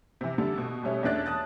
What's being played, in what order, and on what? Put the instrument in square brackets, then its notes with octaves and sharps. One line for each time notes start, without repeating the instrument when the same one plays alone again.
[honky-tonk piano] C3 E3
D3 G3 A4
B2
B2 G3 A3 C#4
E2 A3 C#4 D4 F#6 A6
A5 D#6 F#6 A6